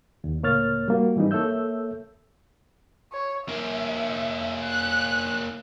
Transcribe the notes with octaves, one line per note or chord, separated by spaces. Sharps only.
D#2
C#2 A2 A#3 C#5 F6 A6
G3 A#3 F#4
G#2 E3 G3 C4 D#4
A#3 A4 C#5 E5 E6 G6
C#5
A#3 C#4 E5
F#6